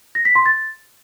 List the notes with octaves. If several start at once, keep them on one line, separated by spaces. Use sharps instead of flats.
A#6
B6
C6
A6